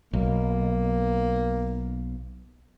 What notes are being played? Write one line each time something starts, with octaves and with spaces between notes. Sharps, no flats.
B1 A#3